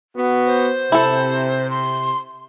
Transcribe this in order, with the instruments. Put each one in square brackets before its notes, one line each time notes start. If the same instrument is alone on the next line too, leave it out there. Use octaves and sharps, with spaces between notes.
[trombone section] B3 F#4
[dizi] C5
[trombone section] C3 [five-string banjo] E4 A4
[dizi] C6